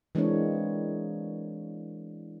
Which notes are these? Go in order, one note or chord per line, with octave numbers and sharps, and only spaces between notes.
E3 G#3 A#3 C4 D4 C#5